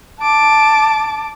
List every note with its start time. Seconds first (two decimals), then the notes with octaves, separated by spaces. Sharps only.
0.20 A5 D6